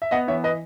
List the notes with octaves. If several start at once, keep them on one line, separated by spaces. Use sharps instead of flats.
E5
B3 D#5 F#5
E3 C#5 E5
B4 D#5